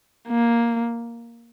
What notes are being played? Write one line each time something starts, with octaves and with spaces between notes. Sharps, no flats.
A#3